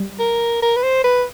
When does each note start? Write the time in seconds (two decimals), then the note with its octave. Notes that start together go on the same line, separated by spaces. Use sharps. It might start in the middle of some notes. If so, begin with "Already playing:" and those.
Already playing: G3
0.19 A#4
0.62 A#4
0.76 B4
0.83 C5
1.04 B4